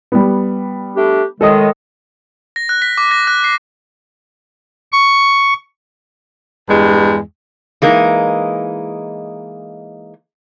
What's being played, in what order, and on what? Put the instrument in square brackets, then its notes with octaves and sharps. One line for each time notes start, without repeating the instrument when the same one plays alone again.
[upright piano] G3 B3
[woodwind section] A3 D4 G4
[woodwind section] A2 D#3 G#3 [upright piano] A4 D#5 D#6
[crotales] A#6
F#6
B6
D6
A#6
F#6
C7
[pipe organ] C#6
[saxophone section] E2 G2 G#3
[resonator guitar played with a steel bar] E3 G#3 A#3 D#4